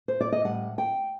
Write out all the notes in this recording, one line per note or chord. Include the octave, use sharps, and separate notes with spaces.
C5
D5
D#5
A2 G3 F#5
G5